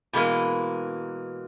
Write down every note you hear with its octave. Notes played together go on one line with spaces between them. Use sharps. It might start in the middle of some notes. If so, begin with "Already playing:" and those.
B2 E3 G#3 A#3